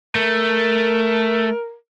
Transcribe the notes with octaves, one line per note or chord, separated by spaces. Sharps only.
A3 A#4